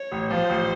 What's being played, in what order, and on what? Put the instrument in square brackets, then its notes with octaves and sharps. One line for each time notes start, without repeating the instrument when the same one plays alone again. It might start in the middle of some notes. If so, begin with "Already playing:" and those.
Already playing: [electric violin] C#5
[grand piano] A1
[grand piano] F3 [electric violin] C5
[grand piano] A1